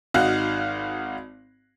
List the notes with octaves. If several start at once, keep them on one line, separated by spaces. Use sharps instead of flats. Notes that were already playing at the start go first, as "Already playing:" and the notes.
G#1 D#4 F#4 F5 F#6